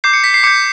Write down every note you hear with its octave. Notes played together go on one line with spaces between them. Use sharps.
D6 G6 C7
C#7
B6
C7
D6 G6 C#7